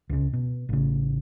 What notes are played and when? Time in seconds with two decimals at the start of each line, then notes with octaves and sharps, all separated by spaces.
0.10 C#2 C#3
0.33 B2
0.69 A1 C#3